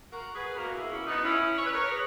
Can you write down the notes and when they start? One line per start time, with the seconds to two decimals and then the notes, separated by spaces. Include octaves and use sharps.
0.12 F#4 A#4
0.34 G#4 B4
0.57 B2 A#3 F#4 A#4
0.74 E4 G#4
0.91 C#4 E4
1.07 B3 D#4
1.25 C#4 E4
1.58 C#5
1.66 B4
1.74 A#4 C#5
1.91 G#4 B4